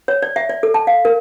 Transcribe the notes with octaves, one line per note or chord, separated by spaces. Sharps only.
C#5
D5
E5
D5
A4
A5
F5
A#4